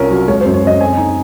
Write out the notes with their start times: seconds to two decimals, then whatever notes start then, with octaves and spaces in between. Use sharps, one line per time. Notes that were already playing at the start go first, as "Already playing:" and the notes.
Already playing: C2 C#4 F4 A#4
0.10 F#3
0.28 G#3 C#5
0.41 C5
0.45 F#2
0.54 C#5
0.63 F#2 D#5
0.80 C4 G#5
0.97 D#4